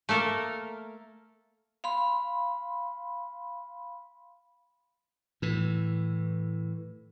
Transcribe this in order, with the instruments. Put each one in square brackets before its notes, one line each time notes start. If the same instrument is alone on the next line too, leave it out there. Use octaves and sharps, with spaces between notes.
[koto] A3 A#3 A4 A#4
[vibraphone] F5 B5 C6
[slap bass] A2 E3